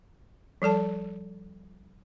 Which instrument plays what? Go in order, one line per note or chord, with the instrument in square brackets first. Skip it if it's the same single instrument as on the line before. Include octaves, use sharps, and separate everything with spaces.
[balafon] F3 G3 A4 A5